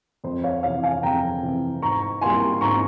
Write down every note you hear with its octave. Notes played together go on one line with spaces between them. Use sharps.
F2 C5
C#5 F5
C3 E3 C#5 F5
F5 G#5
F2 G5 A#5
C3 E3
G#2 A#5 C#6
G3 A#3 E4 G#5 C6
G#2 A#5 C#6